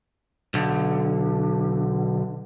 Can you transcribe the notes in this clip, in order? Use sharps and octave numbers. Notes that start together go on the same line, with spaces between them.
B1 D3